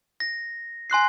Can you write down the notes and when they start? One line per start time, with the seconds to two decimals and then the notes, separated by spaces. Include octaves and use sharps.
0.20 A#6
0.90 G#5 C6 F#6 C7